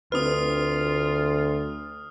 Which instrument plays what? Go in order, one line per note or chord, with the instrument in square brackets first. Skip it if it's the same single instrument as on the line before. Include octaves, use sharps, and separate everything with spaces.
[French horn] D2 [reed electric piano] C4 D4 B4 [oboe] F4 [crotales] D#6 F6